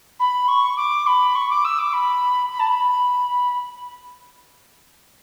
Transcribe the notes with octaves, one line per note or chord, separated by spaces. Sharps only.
B5
C#6
D6
B5
C#6
D6
E6
D6
B5
B5
A5
B5